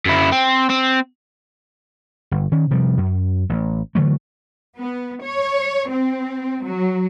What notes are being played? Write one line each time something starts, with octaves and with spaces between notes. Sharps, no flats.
F#2 E4
C4
C4
G1
D#3 C#4
C3 F3 G3
F#2
A1
D3 E3 F#3 A3
B3
C#5
C4
F#3